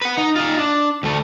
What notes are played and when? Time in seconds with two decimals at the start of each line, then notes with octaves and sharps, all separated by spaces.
0.01 B4 F#5
0.17 D#4
0.36 D#4 F4
0.59 D4
1.03 D2 A3